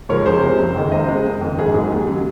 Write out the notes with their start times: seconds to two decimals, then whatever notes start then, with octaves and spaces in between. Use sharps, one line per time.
0.09 G#2 F3 G#3 A#4 C#5
0.26 C#2 G#4 C5
0.43 C3 F3 G#3
0.59 F#1
0.76 F2 D#3 G#3
0.92 C#2 C5 D#5
1.08 C#3 G#3
1.25 F#1
1.41 F2 D#3
1.59 G#1 G#4
1.74 G#2 F#3 G#4
1.92 D#2
2.07 C#3 F#3